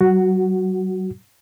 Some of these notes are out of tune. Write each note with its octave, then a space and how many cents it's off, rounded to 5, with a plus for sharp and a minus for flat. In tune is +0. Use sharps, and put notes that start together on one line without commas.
F#3 +35 F#4 +0 F#5 +20